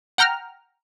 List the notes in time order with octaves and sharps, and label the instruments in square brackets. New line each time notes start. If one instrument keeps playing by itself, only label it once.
[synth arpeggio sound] F#5 G5 A#5 F6